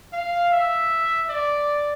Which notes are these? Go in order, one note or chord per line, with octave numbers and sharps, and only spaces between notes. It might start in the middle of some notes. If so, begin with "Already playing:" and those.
F5
E5
D5